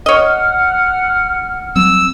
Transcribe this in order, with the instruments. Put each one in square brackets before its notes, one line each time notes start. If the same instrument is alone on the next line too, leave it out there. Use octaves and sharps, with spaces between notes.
[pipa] C#5 D#5 [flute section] F#5 F6
[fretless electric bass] F#3 G3 C4 [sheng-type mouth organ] E6